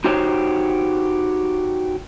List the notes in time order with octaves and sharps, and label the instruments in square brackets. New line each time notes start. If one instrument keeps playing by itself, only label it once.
[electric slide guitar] D#4 F#4 G4 C5 C#5